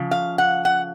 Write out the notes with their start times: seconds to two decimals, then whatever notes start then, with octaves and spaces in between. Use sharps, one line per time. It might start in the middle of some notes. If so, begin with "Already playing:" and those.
Already playing: C#3 F3
0.11 F5
0.38 F#5
0.65 F#5